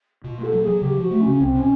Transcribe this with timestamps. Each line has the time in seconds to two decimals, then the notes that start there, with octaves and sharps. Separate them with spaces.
0.24 B2 F4
0.38 A#3 A4
0.53 F#3
0.63 F#3 G#4
0.82 C#3 G4
0.97 F3 F#4
1.11 A3
1.21 C#3 C#4
1.40 C2 C4
1.55 B2 C#4